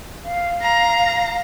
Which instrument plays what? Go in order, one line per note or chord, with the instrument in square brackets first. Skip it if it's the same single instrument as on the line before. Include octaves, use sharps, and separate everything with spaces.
[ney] F5
[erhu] A#5